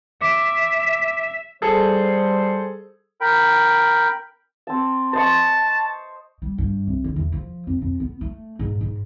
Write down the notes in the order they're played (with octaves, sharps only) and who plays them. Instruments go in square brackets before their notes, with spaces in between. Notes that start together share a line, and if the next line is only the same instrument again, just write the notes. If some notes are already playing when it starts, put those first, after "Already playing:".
[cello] E5 [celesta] D6 D7
[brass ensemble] G3 C5 [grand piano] G#4 A4
[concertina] A#4 G5 B5
[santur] C4 A5
[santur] C5 D#5 C#6 [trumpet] A5
[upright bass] G3
G2
C2
D3
E2
F3
F2
F2
B3
A3
G#2
G#2